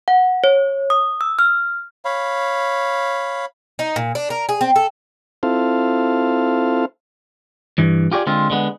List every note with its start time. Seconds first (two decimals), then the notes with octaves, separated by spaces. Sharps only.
0.08 F#5
0.44 C#5
0.90 D#6
1.21 E6
1.39 F6
2.05 C#5 F5 B5
3.79 D#4
3.96 A#2
4.15 D4
4.30 A#4
4.49 G#4
4.61 C4
4.76 A4
5.43 C4 E4 F4 A4 C5 F5
7.78 G2 E3
8.12 F4 G4 G#4 D5
8.27 D3 G#3 C4 F4
8.50 D3 G#3 B3